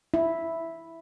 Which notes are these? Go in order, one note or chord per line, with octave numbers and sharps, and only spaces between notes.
E4